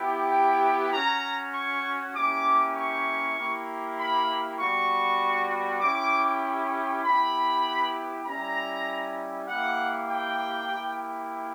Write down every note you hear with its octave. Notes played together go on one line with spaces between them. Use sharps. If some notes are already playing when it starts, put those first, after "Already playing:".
Already playing: B3 E4 G4
G5
C#4 F#4 A#5
C#6
A#3 C#4 E4 G4 D6
C#6
A#3 E4 G4
B5
G3 B3 F#4 C#6
C#4 E4 G4 D6
B3 E4 G4 B5
G3 C#4 E4 A#5
A#3 E4 G4 F#5
G5
A#3 E4 G4